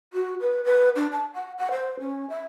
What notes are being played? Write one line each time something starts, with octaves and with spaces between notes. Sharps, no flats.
F#4
B4
B4
D4
A5
F#5
F#5
C5
C#4
E5